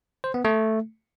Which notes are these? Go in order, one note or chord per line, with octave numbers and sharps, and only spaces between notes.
C5
B3
A3